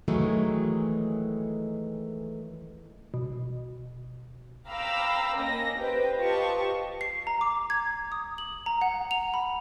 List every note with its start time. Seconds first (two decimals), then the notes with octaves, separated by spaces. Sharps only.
0.08 D#3 E3 F#3 G#3 A3
3.14 B2
4.67 F5 G5 A#5 B5 D6 E6
5.36 A#3 C#4 D#5 A#6
5.79 G4 B4 C5 G5
6.18 F4 G4 B4 D#5 A5 C#6
7.01 C7
7.27 A#5
7.41 D6
7.70 G#6
8.12 D#6
8.38 F#7
8.66 A#5
8.81 F#5
9.11 F7
9.34 B5